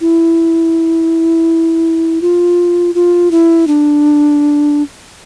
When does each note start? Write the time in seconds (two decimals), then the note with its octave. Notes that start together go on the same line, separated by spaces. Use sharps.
0.01 E4
2.22 F4
2.95 F4
3.31 E4
3.67 D4